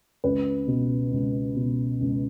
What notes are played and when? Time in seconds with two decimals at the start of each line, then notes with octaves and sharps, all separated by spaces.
0.24 C#2 B4
0.68 B2
1.12 C#2
1.56 B2
2.01 C#2